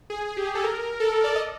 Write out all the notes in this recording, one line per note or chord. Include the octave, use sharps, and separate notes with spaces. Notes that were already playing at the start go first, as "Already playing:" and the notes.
G#4
G#4
G4
G#4
A4
A#4
A4
D5
D#5